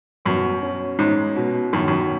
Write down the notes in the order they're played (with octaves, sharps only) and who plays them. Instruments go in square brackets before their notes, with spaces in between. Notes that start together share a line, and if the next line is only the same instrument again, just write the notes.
[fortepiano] F#2 [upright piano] B2
[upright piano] C#4
[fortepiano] G#2 [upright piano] C#4
[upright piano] B2
[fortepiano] F#2 [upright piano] D#3
[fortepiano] F#2